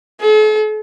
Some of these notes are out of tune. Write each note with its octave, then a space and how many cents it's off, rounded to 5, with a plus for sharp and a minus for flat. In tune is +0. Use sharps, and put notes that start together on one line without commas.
A4 -45